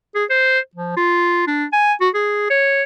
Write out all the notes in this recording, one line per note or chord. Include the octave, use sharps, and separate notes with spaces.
G#4
C5
F3
F4
D4
G#5
F#4
G#4
C#5